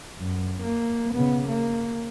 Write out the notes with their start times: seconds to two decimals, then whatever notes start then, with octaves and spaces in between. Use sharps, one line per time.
0.19 F#2
0.62 A#3
1.14 C#3 B3
1.48 A#3